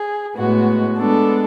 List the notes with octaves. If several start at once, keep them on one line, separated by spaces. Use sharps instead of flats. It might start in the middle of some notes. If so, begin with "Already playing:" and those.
Already playing: G#4
A2 G#3 B3 F#4
G#3 B3 D4 A4